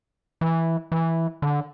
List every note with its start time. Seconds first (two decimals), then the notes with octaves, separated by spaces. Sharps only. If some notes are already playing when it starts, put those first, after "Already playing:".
0.41 E3
0.92 E3
1.42 D3